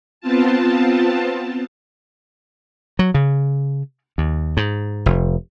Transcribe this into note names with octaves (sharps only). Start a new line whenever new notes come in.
B3 C4 F4 A5
F#3
C#3
D#2
G#2
F1